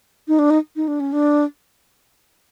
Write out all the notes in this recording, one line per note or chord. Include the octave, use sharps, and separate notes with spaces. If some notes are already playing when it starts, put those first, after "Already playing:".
D#4
D4
D#4
D#4
D4
C#4
D4